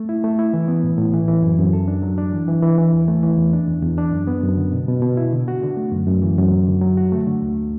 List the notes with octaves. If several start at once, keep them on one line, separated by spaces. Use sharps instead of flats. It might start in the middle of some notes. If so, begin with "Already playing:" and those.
Already playing: A3
E4
A3
E4
E3
B3
A2
A2
E3
E3
F#2
F#2
A4
D4
F#3
D4
E3
E3
E3
E3
E2
A3
E3
E2
D4
E2
E2
D4
F#2
B3
F#2
D3
B2
B2
B2
E4
D3
F#4
D3
A3
F#2
F#2
E3
F#2
F#3
D3
F#3
F#4
A3
D3
D2